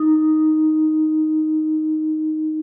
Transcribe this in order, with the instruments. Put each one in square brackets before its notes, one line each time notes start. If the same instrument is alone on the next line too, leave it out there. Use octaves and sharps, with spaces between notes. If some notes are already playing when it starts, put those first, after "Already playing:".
Already playing: [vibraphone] D#4